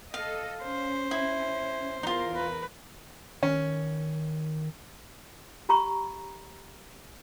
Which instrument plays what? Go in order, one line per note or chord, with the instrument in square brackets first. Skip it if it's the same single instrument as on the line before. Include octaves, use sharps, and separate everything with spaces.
[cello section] A4 D#5 [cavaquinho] F5
[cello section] C#4 [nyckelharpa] C5
[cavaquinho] E4
[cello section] E2 A#4 [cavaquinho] D#4 F4
[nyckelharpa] B4
[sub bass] D#3 [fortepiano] C#4
[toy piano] G4 A#5 B5 C#6